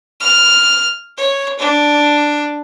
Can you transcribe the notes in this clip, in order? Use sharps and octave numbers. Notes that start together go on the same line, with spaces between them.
F6
C#5
D4